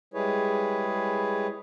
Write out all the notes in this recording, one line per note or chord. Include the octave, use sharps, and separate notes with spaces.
G3 G#3 E4 G#4 B4 C#5